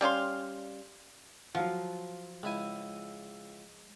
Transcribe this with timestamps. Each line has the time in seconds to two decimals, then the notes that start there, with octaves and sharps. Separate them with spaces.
0.01 G3 C#4 F5 C6
1.55 F3 F#3 F4 F5 F#5
2.43 C#2 G#3 E4 G#5